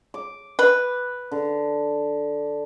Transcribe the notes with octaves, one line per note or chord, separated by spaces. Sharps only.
D6
B4
D3